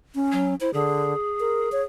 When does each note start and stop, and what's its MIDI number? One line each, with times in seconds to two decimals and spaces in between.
0.15 0.55 61
0.32 0.54 54
0.61 0.70 64
0.61 0.73 72
0.74 1.14 50
0.74 1.84 68
1.40 1.71 70
1.72 1.82 73